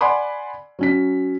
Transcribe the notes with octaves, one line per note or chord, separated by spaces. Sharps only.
D5 F#5 G#5 B5 C6 D6
F#3 C#4 B6